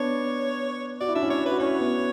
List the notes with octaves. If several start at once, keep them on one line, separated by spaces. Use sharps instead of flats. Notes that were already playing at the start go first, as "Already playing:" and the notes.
Already playing: B3 D4 C#5
F#4 D5
E4
D4 E5
C#4 E4
C#5
B4
F#4
C#4 E4 C#5
B3